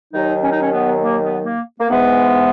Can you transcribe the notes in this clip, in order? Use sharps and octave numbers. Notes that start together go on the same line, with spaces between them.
D#2 D#3 F#3 D#4
C#4
D#4
C#4
B3
A#3
B3
A#3
A#3
G#2 E3 G#3 B3